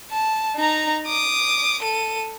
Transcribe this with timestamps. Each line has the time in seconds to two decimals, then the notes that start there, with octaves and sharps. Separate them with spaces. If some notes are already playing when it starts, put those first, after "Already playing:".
0.11 A5
0.56 D#4 A#5
1.07 D6 D#6
1.82 A4 D#7